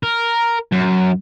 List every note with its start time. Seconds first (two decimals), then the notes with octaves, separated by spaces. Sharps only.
0.03 A#4
0.72 F#2